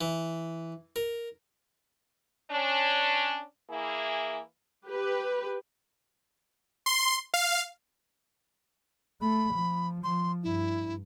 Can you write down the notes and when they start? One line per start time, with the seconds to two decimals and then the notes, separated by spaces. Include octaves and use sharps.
0.01 E3
0.96 A#4
2.51 C#4 D4
3.70 E3 A#3 E4 G#4
4.86 G4 B4
6.86 C6
7.34 F5
9.21 A3 B5
9.54 F3
10.04 F3 C6
10.44 G2 E4